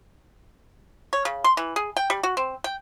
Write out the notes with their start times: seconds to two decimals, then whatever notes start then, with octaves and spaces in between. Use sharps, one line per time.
1.13 C#5
1.25 C#3
1.44 C6
1.57 E3
1.76 G#4
1.97 G5
2.10 G3
2.23 F#4
2.37 C4
2.64 G5